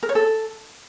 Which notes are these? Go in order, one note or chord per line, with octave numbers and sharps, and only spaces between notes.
A#4
C#5
A4